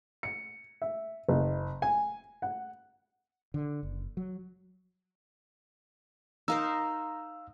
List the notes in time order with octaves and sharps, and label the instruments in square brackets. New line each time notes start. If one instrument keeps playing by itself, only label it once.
[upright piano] C#7
E5
F#1
G#5
F#5
[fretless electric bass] D3
F#1
F#3
[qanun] D#4 A#4 C5 [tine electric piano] F5 E6